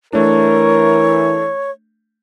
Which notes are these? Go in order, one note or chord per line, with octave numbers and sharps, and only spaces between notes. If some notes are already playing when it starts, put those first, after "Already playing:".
E3 A3 D4 A#4 C#5